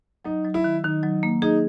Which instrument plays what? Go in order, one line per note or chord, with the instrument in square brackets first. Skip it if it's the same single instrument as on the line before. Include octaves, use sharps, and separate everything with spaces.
[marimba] F#3 [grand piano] D#4
[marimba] F#3
[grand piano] E4
[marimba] D#3
[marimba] D#3 [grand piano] D#4
[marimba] F#3
A#3
[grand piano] D#4 [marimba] G#4